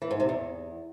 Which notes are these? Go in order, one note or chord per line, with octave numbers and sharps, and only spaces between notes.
E3
G#2
C3
E2